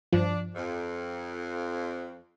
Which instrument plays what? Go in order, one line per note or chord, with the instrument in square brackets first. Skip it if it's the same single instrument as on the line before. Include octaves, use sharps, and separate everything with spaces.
[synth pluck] G2 F3 [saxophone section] D4
[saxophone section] F2